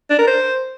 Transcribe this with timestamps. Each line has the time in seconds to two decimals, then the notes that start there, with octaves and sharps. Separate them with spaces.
0.10 D4
0.19 A#4
0.27 C5